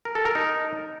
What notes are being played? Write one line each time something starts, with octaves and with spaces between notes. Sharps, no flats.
A#4
A4
A#4
D#4